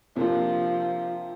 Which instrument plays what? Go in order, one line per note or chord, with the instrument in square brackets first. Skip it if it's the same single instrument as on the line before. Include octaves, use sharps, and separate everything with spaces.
[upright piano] C3 A#3 D4 [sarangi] F3